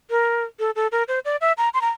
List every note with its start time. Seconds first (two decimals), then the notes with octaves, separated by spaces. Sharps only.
0.10 A#4
0.59 A4
0.76 A4
0.92 A#4
1.08 C5
1.25 D5
1.41 E5
1.58 A#5
1.74 C6
1.81 A#5